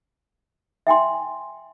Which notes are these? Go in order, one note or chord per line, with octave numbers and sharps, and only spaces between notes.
E5 G5 G#5 C6